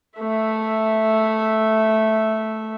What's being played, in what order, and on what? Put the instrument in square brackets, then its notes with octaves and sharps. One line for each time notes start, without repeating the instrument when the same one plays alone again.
[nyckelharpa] A3 E5